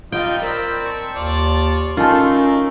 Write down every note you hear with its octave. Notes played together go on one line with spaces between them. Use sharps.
G3 D#4 F4 D#5 G5
C4 A#4 D5 B5
A5 C#6
D#2 F4 D5
A3 C#4 D#4 F4 A4 A#4 C6